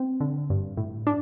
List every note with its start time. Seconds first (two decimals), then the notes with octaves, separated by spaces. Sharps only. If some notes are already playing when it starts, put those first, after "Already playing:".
Already playing: C4
0.20 D3
0.50 G2
0.77 A2
1.07 D4